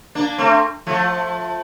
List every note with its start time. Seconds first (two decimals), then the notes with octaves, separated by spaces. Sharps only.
0.15 A#3 D4
0.38 A3 C4
0.87 F3 A3